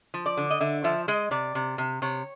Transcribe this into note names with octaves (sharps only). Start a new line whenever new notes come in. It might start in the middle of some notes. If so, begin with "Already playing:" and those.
F3
D5
D3
D#5
D3 E5
F3 E5
G#3 D#5
C3 D5
C3
C3
C3 C#5